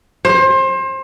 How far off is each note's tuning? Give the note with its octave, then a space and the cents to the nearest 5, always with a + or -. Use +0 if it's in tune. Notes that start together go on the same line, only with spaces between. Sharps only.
C5 +30